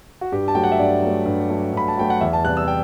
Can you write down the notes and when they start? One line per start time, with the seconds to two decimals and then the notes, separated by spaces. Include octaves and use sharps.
0.21 F#4
0.32 G2 G4
0.48 A5
0.55 F#3 A3 G5
0.64 F#5
0.72 E5
0.79 G2 D5
1.02 F#3 A3
1.26 G2
1.49 F#3 A3
1.73 G2 B5
1.88 A5
1.97 F#3 A3 G5
2.10 F#5
2.21 E2 E5
2.33 A5
2.44 C3 E3 G3 F#6
2.57 E6
2.68 G5